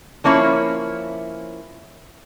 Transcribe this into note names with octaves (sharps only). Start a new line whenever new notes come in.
F3 A#3 C#4 E4 C#5